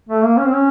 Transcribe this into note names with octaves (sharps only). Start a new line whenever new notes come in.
A3
A#3
C#4
C4
C#4